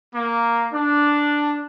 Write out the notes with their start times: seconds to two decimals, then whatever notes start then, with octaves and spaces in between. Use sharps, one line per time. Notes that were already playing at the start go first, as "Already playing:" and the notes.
0.15 A#3
0.73 D4